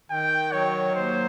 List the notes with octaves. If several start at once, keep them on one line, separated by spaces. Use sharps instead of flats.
D#3 G5
F#3 C#5
D#2 C5